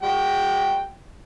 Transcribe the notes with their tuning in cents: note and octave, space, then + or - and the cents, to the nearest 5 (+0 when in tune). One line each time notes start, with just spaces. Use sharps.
G#3 -25 F#4 +0 G5 +0